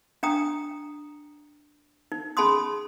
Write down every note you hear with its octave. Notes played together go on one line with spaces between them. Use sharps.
D4 G5 A#5 D#6
D#4
C#4 G#4 A5 B5 C6 D#6